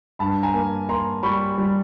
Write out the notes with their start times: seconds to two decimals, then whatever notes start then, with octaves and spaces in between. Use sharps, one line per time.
0.19 G2 A5 B5
0.43 G#5 A#5
0.54 A#3
0.89 A#3 A#5 C6
1.23 G3 B5 C#6
1.58 G3